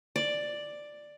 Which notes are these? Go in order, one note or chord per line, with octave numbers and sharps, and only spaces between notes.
D5